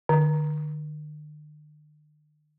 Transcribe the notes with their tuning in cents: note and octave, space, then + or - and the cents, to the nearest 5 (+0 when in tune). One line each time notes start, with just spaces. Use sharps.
D3 +45